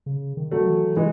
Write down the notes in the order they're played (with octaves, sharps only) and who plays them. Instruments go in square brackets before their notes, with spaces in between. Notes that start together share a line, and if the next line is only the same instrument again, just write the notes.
[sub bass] C#3
D#3
[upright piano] F#3 A3
[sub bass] E3
[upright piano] E3 G#3